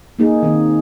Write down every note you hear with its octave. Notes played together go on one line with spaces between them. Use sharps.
A#3 D#4 G#4
D#3 C4